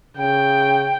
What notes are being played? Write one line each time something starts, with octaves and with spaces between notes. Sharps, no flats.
C#3 G5